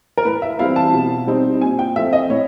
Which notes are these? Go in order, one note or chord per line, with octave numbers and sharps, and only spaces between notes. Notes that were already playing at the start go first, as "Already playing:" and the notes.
A#4
A2 B4
E5
E3 G3 C4 E4 F5
A5
B2
G3 C4 D#4
A#2 G#5
G5
F3 A3 C4 E5
D#5
A2 C#5